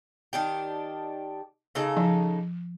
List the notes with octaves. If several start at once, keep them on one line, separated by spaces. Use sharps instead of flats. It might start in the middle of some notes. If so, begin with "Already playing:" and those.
D#3 D4 G4
C#3 D#4 A4
F3